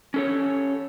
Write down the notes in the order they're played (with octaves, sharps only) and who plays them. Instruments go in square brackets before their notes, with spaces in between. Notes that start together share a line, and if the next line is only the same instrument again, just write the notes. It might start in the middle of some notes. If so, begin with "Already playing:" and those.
[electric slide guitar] C#4 A4 C#5